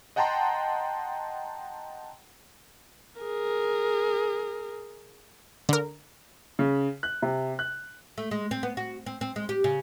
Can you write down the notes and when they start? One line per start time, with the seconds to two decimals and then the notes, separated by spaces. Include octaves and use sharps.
0.16 D#5 F#5 G5 A5 A#5 C6
3.20 G#4 A#4
5.69 D3 A#4
6.59 C#3
7.03 F#6
7.22 C3
7.59 F#6
8.18 A3
8.31 G#3
8.51 C4
8.63 B3
8.77 F#4
9.06 C4
9.21 C4
9.36 G#3
9.49 G4
9.64 C#3